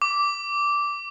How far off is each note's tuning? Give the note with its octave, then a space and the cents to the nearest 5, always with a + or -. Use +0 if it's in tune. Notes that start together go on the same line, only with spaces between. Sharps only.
D6 -10